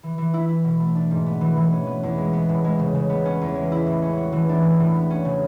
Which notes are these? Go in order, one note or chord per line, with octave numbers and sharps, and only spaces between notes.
E3
E3
E4
E4
B2
A3
D4
G#2
B3
E3
E3
C#4
B3
E2
G#3
B3
A2
G#3
C#3
C#3
B3
C#4
E2
G#3
E4
A2
C#4
F#4
E3
D4
A2
A2
B3
C#4
C#3